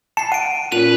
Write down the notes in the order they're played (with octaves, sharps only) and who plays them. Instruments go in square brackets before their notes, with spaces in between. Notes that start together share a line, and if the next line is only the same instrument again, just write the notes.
[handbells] A5 [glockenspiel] C7 C#7
[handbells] F#5 [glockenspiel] D7 D#7
[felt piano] A#2 C#4 [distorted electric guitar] B4 [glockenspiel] F7